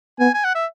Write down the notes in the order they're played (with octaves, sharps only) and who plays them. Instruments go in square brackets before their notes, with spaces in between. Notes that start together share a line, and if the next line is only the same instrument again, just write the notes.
[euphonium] B3 [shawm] G#5
[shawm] G#5
F#5
E5